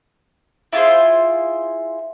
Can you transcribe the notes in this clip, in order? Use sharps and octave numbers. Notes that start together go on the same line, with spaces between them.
E4 F4 G#4 C5